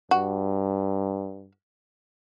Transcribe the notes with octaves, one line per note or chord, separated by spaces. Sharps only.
G2 F#4